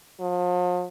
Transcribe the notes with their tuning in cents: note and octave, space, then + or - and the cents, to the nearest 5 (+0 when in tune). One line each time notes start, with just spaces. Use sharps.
F3 +40